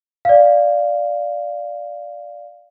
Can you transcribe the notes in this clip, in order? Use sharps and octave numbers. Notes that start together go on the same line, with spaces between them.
D5 F5